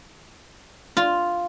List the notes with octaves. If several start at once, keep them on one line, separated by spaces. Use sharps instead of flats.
F4